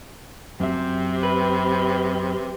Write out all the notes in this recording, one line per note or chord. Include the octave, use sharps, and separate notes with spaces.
F#2 C3 C4 E5
B4